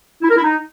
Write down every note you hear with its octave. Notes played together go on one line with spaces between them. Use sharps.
E4
A#4
E4
D#4